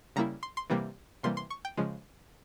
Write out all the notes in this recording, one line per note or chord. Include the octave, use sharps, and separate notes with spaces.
C#3 G3 A#3 E4 A#5
C6
C6
C3 E3 G3 A#3
C3 E3 G3 A#3 C6
C6
C#6
G5
C#3 F3 G#3